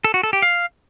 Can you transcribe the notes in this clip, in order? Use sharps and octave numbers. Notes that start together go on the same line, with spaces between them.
A4
F#4
A4
G4
F5